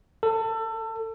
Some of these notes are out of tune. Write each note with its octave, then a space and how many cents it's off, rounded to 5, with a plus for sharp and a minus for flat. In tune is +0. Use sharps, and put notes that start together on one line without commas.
A4 +25